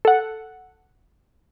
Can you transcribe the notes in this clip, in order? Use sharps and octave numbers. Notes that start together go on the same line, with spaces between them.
A4 F#5